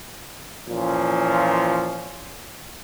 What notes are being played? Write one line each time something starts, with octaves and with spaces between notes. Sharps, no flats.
A#2 E3 F3 C#4